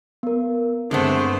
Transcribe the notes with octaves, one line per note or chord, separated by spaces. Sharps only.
B3 A#4
G2 D3 G#3 A3 B3 C4 C5